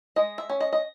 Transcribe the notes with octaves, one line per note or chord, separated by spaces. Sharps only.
G#3 D#5
E5
C#4
D#5
D#5